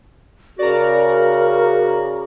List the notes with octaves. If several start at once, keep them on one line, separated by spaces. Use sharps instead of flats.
C#3 F#4 A#4 D5 A#5